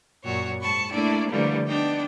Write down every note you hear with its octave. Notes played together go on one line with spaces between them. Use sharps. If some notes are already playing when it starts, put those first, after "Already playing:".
F#2 A#2 F#4 C#5
G#2 A5 B5 C#6
A3 A#3 D4 E4 D5
D3 E3 F3 G3 A3 A#3
B3 D4 D#4 G5